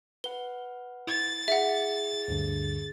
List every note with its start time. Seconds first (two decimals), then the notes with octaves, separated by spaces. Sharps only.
0.24 B4 F#5 G7
1.07 E4 A6
1.48 G#4 E5 F#5
2.28 D2 G2 D3